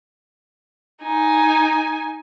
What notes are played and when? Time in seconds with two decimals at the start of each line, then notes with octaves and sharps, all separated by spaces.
1.02 D#4 G#5